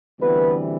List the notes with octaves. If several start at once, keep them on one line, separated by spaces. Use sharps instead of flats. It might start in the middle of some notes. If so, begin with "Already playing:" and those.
D2 C3 E3 G3 B3 B4